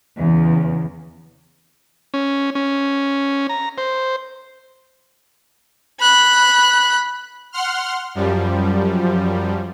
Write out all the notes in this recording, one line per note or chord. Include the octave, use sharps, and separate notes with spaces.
E2 C#3
C#4
C#4
A#5
C5
B5 F#6
F#5 C6 F6
F#2 F3 G3